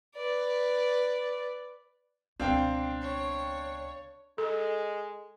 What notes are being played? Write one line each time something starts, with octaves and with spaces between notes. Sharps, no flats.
B4 D5
C#2 B2 C4 D4 F5 G5
C#5
G#3 A4